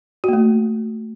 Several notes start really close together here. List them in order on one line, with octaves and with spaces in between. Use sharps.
F#4 A#3 A3